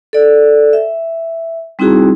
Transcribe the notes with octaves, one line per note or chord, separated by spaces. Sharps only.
A4 D5
E5
G3 C4 D#4 E4 F#4 G#4